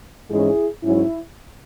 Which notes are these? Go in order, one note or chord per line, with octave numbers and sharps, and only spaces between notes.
G#2 E3 G#3 C#4 E4 G#4
G#2 F#3 C#4 E4